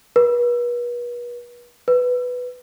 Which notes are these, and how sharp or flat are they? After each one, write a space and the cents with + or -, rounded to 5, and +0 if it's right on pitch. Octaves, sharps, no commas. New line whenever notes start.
B4 -40
B4 +5